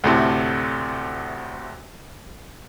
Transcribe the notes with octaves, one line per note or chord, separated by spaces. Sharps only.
D2 A2 C3